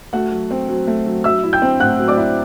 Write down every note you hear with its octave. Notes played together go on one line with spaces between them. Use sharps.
A3 F#4 F#5
F#3
C4
F#3
A3
F#3
F#3 E5 E6
E4
G5 G6
C4
A2 F#5 F#6
F#3
D5 D6
E4